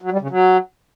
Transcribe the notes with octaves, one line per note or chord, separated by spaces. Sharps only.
F#3
G3
C#3
F#3